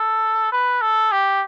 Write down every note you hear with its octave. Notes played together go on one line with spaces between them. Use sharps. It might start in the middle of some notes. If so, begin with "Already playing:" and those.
Already playing: A4
B4
A4
G4